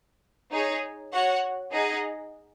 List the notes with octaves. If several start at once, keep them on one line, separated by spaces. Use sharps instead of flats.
D#4 G#4 C#5
F#4 C#5 F#5
D#4 G#4 D#5 F#5